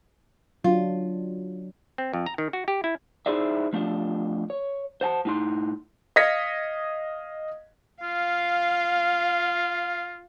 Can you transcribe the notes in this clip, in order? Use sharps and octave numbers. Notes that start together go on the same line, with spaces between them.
F#3 D4 F4
C4
F2
A#5
D#3
F#4
G4
E4
D#4 E4 G#4 C5 D5 E5
F3 A3 D4 F4
C#5
C5 F#5 G#5 A5
A2 D#4 C6
D#5 F5 G#6 A#6 B6 C#7
F4 F5